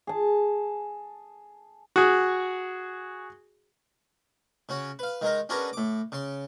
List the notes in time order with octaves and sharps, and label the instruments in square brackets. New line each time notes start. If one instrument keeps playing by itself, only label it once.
[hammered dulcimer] G#4 A5
[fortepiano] F#4 G#4
[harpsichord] C#3 C#4 F#4
B4 F5
D#3 G#3 D#4 A#4
C#4 D4 F#4 G#4 A#4 B4
A2 D6
C#3 C6